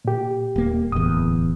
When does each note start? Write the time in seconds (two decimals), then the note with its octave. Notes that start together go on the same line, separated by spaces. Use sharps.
0.05 A#2 G4
0.56 D#1 A#3
0.92 D1 E2 D#6